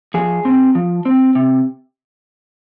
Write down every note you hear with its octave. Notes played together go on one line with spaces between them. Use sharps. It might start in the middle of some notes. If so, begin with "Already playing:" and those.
F3 G#4
C4
F3
C4
C3